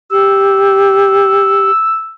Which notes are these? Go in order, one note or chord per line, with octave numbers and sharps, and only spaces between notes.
G4 E6